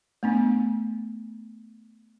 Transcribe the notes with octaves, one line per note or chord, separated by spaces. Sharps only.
A3 B3 D4